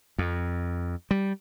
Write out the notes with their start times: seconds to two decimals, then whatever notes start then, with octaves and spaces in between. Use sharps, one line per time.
0.18 F2
1.11 G3